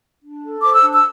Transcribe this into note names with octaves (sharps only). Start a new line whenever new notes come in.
D4
A4
C5 D6
E6
D4
E6